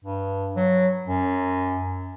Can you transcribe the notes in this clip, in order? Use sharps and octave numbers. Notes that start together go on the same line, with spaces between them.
G2
F#3
F#2